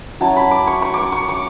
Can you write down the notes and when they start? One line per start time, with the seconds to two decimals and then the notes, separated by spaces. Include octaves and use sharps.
0.21 F#3 C#4 E4 A5
0.36 B5
0.51 D6
0.67 C#6
0.82 C#6
0.94 C#6 D6
1.12 C#6
1.29 D6